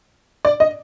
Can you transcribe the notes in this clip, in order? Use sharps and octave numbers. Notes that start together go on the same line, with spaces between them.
D5
D#5